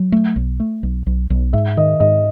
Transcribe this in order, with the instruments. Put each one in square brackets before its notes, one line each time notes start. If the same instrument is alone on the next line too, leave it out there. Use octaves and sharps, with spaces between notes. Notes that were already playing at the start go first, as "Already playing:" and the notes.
Already playing: [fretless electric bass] F#3
A3
B1
A3
B1
B1
B1
[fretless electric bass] G#2 [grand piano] E5
[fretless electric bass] D#3 [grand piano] D#5
[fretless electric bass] G#2 [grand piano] D#5